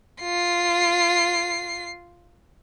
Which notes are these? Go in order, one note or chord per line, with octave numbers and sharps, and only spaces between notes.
F4 C7